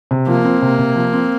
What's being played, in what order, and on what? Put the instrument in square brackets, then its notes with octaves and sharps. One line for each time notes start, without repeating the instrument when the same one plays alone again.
[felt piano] C3
[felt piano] F3 [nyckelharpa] A#3
[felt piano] C4
C3
C3
F3
C4